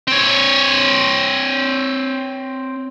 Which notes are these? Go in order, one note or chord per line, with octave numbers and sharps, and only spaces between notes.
C4 C#5